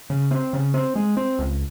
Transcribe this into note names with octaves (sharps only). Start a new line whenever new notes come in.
C#3
C4
C#3
C4
G#3
C4
C#2